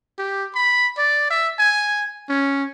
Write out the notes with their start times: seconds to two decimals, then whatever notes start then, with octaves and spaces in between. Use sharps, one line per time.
0.19 G4
0.54 B5
0.98 D5
1.30 E5
1.59 G#5
2.29 C#4